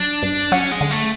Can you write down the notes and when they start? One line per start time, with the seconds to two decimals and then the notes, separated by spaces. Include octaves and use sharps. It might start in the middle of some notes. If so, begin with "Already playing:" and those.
Already playing: F#3 D4
0.23 G2
0.52 F#3 C#4
0.72 G#3
0.81 D3
0.91 A3